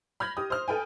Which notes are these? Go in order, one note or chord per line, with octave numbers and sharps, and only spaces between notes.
B5 F6 G6 G#6 A#6
G4 D#6
C5 F6
A4 B4 G5 G#5